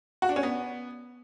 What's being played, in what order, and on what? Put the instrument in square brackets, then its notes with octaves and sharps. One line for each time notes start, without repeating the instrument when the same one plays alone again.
[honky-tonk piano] F#4
D4
C#4
B3